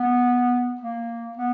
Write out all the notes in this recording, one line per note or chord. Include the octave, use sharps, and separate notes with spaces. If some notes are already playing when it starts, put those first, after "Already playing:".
Already playing: B3
A#3
B3